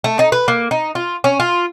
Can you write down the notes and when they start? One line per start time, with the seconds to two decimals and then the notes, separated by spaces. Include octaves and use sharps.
0.04 A3
0.19 D#4
0.32 B4
0.48 A#3
0.71 D#4
0.95 F4
1.24 C#4
1.40 F4